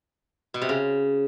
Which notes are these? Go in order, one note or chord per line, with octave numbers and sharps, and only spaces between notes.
B2
C3
C#3